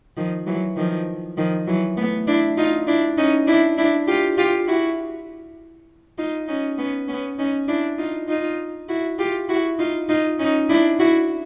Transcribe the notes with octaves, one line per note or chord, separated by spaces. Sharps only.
D#3 F3
E3 F#3
D#3 F3
D#3 F3
E3 F#3
A3 B3
D4 E4
D#4 F4
D4 E4
C#4 D#4
D4 E4
D4 E4
F4 G4
F4 G4
E4 F#4
D#4 F4
C#4 D#4
B3 C#4
B3 C#4
C#4 D#4
D4 E4
D#4 F4
D#4 F4
E4 F#4
F4 G4
E4 F#4
D#4 F4
D#4 F4
C#4 D#4
D4 E4
E4 F#4